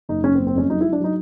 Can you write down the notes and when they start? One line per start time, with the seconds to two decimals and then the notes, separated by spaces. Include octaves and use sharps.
0.09 F#1 D#4
0.24 F#1 C#4
0.35 C4
0.39 F#1
0.47 C4
0.55 F2 C#4
0.69 F#3 D#4
0.81 E4
0.85 F#3
0.93 D4
1.00 F#3 D#4